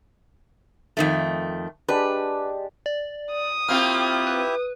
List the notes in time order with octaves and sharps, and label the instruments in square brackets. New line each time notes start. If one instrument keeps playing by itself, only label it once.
[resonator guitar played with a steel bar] F2 D#3 A3
[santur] G#3 D4 G4 [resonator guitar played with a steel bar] B4
[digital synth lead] D5
[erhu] D#6
[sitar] A#3 C4 F4 [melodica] E4 G4 E5 [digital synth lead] F6
[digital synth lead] B4